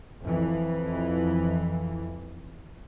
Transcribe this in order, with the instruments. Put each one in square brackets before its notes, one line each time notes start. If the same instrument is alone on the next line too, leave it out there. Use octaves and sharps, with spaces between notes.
[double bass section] F2 E3